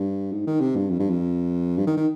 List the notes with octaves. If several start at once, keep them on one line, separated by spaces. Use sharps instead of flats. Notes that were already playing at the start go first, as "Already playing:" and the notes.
Already playing: G2
G#2
D#3
C3
G2
F2
G2
F2
G2
D#3
D#3